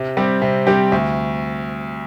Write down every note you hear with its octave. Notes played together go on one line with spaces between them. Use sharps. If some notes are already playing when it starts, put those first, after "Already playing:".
Already playing: C3
G3 C4 G4
C3
G3 C4 G4
D2